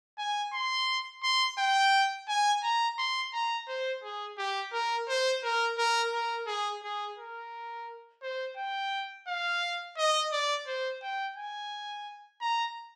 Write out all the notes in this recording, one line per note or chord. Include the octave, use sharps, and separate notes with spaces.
G#5
C6
C6
G5
G#5
A#5
C6
A#5
C5
G#4
G4
A#4
C5
A#4
A#4
A#4
G#4
G#4
A#4
C5
G5
F5
D#5
D5
C5
G5
G#5
A#5